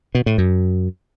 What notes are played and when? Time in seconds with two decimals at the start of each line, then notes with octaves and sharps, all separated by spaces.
0.15 B2
0.26 A2
0.38 F#2